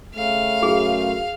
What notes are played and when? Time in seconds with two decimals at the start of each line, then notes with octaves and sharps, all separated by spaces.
0.15 C#3 A3 F5
0.63 F#2 G#4